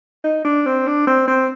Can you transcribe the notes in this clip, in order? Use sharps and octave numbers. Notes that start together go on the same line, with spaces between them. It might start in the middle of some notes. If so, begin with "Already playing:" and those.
D#4
D4
C4
D4
C4
C4